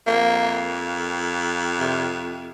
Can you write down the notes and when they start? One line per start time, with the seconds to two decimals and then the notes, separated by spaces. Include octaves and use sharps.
0.07 F2 A#3
1.80 C3